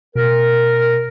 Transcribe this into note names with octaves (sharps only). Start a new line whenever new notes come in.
B2 A#4